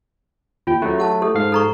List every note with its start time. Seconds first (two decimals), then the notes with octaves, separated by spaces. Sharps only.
0.67 D#2 F4 G5
0.82 F#3 A3 C#4
0.98 G4 F#5 A5
1.22 G4 A4
1.35 G#2 F5
1.52 A4 A#5 C#6